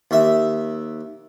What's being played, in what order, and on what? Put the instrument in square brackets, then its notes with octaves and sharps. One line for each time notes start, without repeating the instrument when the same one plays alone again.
[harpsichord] D#2 E5